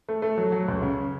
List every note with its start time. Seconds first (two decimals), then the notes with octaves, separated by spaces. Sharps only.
0.09 A3
0.22 A3
0.37 F#3
0.52 F#3
0.68 C#2
0.82 C#3